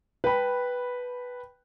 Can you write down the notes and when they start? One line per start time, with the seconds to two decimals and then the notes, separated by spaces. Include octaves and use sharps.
0.24 B4 G5 A5 B5